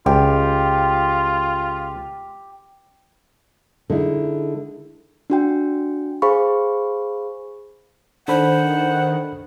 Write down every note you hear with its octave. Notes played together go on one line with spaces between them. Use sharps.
C#2 F4 G4
D3 G#3 D#4 E4
D4 F#4 G5
G#4 C5 F5 B5 C#6
D#3 D4 A4 C5 F#5 B5